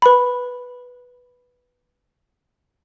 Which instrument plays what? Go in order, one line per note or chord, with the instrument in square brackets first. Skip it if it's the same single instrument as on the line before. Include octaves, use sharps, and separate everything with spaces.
[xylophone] B4 B5